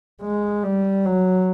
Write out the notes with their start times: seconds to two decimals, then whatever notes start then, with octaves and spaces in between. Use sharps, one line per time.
0.22 G#3
0.63 G3
1.05 F#3